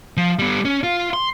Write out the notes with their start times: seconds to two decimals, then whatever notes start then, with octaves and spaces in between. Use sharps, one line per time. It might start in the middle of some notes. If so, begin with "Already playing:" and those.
0.17 F3
0.39 G3 B3
0.65 C#4
0.83 F4
1.13 C6